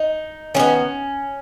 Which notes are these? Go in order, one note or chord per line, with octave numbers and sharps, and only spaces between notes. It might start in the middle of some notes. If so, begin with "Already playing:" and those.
Already playing: D#4
D#3 G#3 B3 C#4